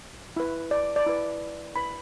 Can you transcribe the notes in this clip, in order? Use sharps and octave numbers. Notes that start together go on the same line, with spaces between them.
E4 B4
D5
D5
E4 B4
E4 B4 B5